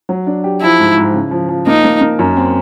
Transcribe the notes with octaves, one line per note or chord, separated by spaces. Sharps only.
F#3
D4
G4
F3 E4
G#2
G#2
C#3
F3
F3
A#3 D#4
A#3
A#3
F#2
C4